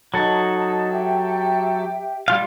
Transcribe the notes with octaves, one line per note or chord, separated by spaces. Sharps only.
F#3 D#4 A4 A5
G4 E5 G5
G3 F4 F5